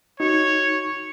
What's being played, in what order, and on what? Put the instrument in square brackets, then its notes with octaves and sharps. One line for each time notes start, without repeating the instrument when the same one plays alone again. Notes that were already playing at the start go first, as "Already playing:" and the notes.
[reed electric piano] D#4 F#4 [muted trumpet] C#5